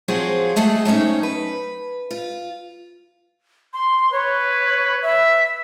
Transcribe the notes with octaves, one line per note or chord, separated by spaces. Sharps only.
F3 F#3 C4 F4 F#4 G#4
G#3 A3 G#4 A4 F#5
F#3 A3 C4 C#4 D#4
B4
F4
C6
B4 C#5
E5